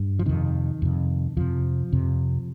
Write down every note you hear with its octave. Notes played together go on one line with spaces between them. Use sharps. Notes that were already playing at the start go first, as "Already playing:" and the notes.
Already playing: G2
F3
F2 C3 D#3
F2 C3
F2 C3 F3
F2 C3